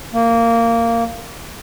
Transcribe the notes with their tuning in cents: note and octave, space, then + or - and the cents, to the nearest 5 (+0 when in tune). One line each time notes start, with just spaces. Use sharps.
A#3 -15